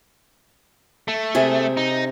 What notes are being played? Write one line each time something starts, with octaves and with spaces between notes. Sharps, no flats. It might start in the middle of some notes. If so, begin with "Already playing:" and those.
A3
C3 G#4
D#4